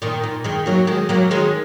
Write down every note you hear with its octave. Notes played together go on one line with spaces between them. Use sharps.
A#2 D#3
A#2
D#3 G#3
F#3 A#3
D#3 G#3
F#3 A#3
D#3 G#3